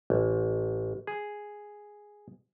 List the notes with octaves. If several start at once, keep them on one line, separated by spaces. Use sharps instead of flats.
A1
G#4